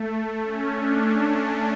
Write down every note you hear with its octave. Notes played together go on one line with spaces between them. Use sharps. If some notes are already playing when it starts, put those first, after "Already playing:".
Already playing: A3
C#4
D4